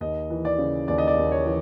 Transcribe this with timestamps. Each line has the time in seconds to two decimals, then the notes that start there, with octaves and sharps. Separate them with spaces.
0.01 D#2 D#5
0.30 E3
0.45 D5
0.58 C#3
0.88 D#2 D5
0.98 D#5
1.07 D5
1.18 D#2
1.32 C#5
1.46 E3